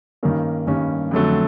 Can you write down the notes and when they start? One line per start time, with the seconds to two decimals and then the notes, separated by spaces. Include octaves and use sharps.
0.23 G2 D#3 G3 A#3 C#4
0.67 G2 D#3 G3 A#3 C#4
1.11 F2 D3 F#3 A3